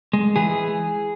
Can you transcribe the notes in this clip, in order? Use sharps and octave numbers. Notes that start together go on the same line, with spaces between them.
G#3
E3 G#4